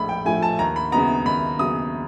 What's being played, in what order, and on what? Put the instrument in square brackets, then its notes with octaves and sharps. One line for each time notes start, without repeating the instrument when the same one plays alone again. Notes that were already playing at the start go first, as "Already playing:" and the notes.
Already playing: [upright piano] A#1 A2 F3 A3 B5
G5
A2 F3 A3 G#5
A5
D#2 A#5
B5
C#3 F#3 B3 A#5
D#2 B5
C#3 F#3 B3 D#6